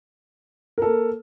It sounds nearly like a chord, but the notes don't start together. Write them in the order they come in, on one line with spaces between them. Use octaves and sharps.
A#4 A4 A#3